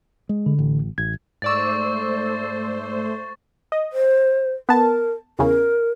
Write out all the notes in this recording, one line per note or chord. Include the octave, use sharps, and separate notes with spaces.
G#3
D3
A1
A1 G#6
G#2 A3 C5 D5 C#6 E6 A6
D#5
C5
B3 A#4 A5
E2 C#3 A#4